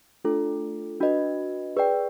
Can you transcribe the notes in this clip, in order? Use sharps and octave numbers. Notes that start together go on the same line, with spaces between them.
A3 D4 F4 A4
D4 F#4 B4 D#5
G#4 B4 D5 G5